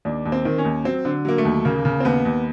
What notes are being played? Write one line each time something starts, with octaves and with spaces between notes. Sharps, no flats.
D#2 D4
D#2
C4
D#3
C#4
D#2
F#3 C4
D3
F#3 A#3
A3
D#2
C#3 A#3
C#3
C4
D#2 B3
D#2